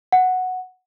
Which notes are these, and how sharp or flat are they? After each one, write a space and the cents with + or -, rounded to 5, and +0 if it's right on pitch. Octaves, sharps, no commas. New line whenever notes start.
F#5 -5